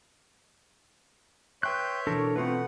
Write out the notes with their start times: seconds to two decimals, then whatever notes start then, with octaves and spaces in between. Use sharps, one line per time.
1.63 B4 C#5 E5 G5 C6 F#6 G6
2.07 B2 E3 D4 A4 A#4 A#6
2.36 A3 B3 C4 F4 B4 F#5